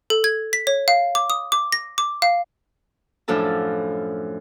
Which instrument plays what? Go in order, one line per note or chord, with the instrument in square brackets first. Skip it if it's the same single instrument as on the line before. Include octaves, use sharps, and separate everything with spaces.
[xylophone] A4
G#6
B6
C#5
F5
D6
D#6
D6
A#6
D6
F5
[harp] F#2 A2 F3 D4 A4 A5